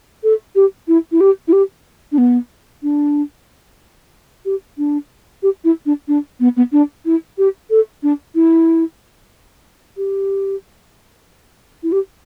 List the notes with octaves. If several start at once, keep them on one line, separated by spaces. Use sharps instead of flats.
A4
G4
E4
E4
G4
E4
G4
D4
B3
D4
G4
D4
G4
E4
D4
D4
B3
B3
D4
E4
G4
A4
D4
E4
G4
E4
G4